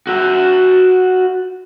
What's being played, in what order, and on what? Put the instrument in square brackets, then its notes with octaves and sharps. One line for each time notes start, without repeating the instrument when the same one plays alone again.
[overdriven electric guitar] F#4 E5